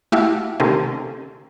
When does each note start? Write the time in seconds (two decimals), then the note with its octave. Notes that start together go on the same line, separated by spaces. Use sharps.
0.12 A3 E4 F#4 G4 E5 F5
0.60 C3 D#3 A3 A#3 C4 C#4